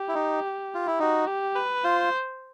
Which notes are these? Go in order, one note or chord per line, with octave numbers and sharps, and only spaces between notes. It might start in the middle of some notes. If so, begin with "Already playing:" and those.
Already playing: G4
E4
D#4
F4
E4
D#4 F#4
G4
B4
F4 C5